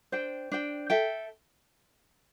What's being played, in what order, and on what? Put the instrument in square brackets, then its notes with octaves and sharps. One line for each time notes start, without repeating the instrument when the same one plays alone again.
[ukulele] D4 C5 G5
D4 C5 G5
A4 E5 G5